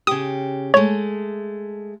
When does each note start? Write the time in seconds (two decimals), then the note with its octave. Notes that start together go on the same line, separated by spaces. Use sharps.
0.07 C#3 G4 D#6
0.74 G#3 A3 C#5